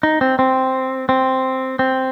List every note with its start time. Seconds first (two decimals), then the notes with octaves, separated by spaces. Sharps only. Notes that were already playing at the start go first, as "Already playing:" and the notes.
0.03 D#4
0.21 C4
0.39 C4
1.09 C4
1.79 C4